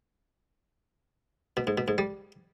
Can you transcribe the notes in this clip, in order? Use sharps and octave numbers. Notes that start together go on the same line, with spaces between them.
B2
G#2
B2
G#2
G3